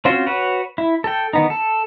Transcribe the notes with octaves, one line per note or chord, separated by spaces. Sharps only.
C4 C#4 F4 F#4 C5
F#4 B4 C#5 F#5
E4
A4 G5
D#3 B3 D#4
A4